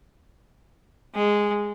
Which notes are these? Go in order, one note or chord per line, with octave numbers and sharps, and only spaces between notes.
G#3